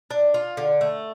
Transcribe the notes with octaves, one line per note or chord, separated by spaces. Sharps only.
D4
F4
D3
A3